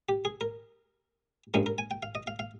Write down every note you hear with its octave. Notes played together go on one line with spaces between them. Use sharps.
G4
G#4
A#4
G2 F3 G#3 C#4 A#4
A#4
G#5
G5
F5
D#5
F5
F5